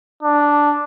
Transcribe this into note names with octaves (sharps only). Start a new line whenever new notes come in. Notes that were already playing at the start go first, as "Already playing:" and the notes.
D4